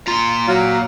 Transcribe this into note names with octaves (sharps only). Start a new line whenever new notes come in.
A#2 F4 A#5
F#3 F5